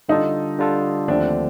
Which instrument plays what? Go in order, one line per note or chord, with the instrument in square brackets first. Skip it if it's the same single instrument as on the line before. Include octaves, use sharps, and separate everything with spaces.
[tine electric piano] D3 G3 D4 F4 A4 [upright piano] D#4
[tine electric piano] D3 G3 D4 F4 A4
[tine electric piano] D#2 D3 F3 A3 C4 [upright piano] D4